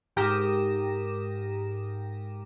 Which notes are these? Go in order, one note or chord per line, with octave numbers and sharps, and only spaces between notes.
G#2 G4 A#4 D#6 A#6 E7